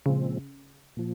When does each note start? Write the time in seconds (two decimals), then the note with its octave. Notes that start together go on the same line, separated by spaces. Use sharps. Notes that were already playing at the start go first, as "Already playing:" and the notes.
0.05 A#2 C#3 F3 G#3 C4
0.97 A#2 F3